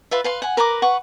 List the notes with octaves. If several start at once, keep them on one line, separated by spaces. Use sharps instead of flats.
F4 B4 E5
B4 F5 C6
F#5 G#5
A#4 B4 A#5 D6
B4 F#5 C#6